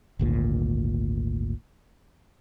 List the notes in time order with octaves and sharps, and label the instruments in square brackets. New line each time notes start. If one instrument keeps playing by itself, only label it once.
[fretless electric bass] G#1 D2 A#2